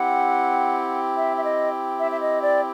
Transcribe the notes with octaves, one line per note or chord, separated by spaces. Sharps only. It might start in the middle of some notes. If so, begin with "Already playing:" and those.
Already playing: C4 E4 G4 F#5
E5
E5
D#5
E5
E5
D#5
D5